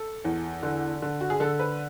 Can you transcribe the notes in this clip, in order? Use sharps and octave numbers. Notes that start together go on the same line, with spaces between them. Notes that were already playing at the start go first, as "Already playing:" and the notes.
Already playing: A4
E2
D3
D3
F#4
G#4
D3 A4
B4